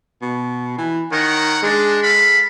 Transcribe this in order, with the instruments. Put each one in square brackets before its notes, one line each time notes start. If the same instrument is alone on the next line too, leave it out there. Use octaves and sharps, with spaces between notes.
[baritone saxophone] B2
E3
[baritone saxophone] D#3 [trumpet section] A#4 C#5 F#5
[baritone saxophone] G#3 [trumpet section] D4
[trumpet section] A4 F5 B5